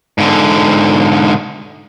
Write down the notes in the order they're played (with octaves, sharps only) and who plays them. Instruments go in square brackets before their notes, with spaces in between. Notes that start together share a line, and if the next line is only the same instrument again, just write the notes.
[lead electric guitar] G#2 D3